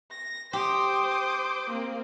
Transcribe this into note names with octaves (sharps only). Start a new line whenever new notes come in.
A#6
G4 C5 D6 D#6
A#3 C4